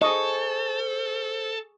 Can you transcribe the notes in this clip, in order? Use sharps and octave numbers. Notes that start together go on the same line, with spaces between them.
G#4 A4 C5 D#5 C#6